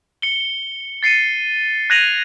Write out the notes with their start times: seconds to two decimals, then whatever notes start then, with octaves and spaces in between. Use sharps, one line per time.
0.22 C#7 G7
1.03 A6 C7 C#7 D#7
1.90 F#6 G#6 A#6 D#7 F7 F#7